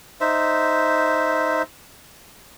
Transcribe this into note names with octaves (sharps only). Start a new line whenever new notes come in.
D#4 C5 E5